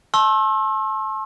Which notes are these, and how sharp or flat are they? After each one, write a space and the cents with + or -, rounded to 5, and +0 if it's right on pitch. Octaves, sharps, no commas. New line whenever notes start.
A5 -20 C6 +45 E6 +0